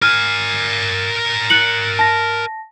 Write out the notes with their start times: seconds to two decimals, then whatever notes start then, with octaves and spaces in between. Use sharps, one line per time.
0.02 A#4 G#5 F6
1.50 F#6 C#7 F#7
1.99 A5 A#6